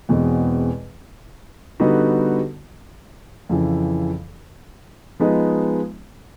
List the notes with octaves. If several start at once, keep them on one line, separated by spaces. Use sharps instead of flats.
E2 B2 G#3 C4
D3 G3 B3 D#4 F#4
F2 C#3 E3
F3 G#3 B3 D#4